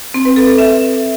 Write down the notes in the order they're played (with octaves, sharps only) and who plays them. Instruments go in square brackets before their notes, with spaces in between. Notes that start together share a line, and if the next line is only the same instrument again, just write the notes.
[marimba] C4
B4
A4
A4
E5